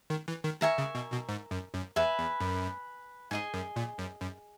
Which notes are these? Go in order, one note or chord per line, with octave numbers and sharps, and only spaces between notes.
D#3
E3
D#3
D#3 A#4 E5 G#5 C#6
C#3
B2
B2
G#2
F#2
F#2
E2 B4 E5 G#5
E2
F#2
G#2 G#4 D#5 G#5
F#2
A#2
F#2
F#2